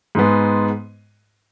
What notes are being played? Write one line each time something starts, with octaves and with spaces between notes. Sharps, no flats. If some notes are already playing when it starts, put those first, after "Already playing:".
G#2 G#3 B3